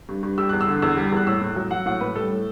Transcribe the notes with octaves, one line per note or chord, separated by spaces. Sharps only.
G2
G2
G3 E6
E2 F#6
E6
D3
E2 E6
G3
E2 F#6
A2 E6
A2
F#3
F#3 F#5
A2 F#5
A2 B4
G3 A4
A2